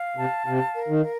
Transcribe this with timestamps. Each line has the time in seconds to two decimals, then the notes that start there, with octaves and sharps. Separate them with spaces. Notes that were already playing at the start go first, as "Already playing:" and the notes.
Already playing: F5
0.17 C3 A5
0.46 C3 F5
0.75 A#4
0.88 D#3
1.03 A#4